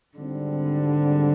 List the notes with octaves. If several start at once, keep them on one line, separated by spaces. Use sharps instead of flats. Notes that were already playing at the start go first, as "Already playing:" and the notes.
G#1 G#2 D3 G3 C4